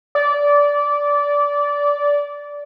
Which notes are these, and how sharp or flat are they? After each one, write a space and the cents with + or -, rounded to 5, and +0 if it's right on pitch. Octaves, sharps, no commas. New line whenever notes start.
D5 -20